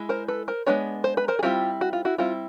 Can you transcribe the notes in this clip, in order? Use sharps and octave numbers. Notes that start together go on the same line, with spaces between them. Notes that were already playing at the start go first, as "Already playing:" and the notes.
Already playing: G#3 E4
A#4 C5
A4 B4
A#4 C5
G#3 B3 D4 B4 C#5
C5
B4
A#4 C5
G#4
G3 C4 E4 F4 G4
F#4
F4
E4 F#4
G3 C4 E4 F4